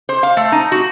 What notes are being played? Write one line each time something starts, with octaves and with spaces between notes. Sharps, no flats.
C5
F5
A3
D#4
F#4